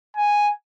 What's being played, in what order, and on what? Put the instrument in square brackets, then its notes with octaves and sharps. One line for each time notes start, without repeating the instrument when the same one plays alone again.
[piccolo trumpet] G#5